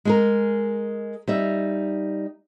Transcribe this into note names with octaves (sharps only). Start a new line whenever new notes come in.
G#3 G#4 A#4
G3 D#4 E5